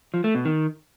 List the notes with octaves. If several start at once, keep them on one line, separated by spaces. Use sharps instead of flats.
F3
A3
B2
D#3